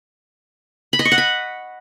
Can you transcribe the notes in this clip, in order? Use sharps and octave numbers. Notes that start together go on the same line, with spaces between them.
B5
D#5
C#6
F#5
B5